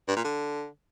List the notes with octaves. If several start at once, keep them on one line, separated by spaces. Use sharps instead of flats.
G2
A#2
D3